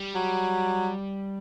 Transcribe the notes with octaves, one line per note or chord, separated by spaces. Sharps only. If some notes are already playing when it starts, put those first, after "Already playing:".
Already playing: G3
F#3